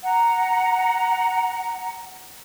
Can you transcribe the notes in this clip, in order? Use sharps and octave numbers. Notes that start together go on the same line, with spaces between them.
F#5 A#5